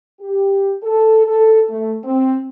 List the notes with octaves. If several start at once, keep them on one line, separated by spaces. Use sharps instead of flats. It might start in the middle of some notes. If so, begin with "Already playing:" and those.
G4
A4
A4
A3
C4